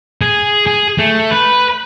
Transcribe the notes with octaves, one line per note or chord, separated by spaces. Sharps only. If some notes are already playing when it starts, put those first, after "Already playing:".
G#4
G#4
A3
B4